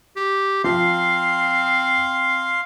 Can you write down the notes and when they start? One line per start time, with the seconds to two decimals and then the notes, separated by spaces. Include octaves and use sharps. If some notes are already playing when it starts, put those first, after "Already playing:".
0.16 G4
0.64 F3 C4 F5 C6